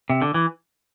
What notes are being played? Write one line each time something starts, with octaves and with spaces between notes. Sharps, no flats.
C3
D3
E3